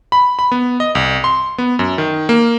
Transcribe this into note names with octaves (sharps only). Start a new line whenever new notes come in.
B5
B5
B3
D#5
C2
C6
B3
F#2
D#3
A#3